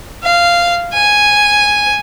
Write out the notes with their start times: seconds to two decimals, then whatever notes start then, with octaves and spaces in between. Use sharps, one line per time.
0.23 F5
0.93 G#5